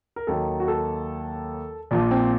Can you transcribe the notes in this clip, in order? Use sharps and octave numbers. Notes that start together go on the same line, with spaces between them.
A#4
D#2 D#3 F#3 A4
F#4
A4
A#1 A#2 F3
C4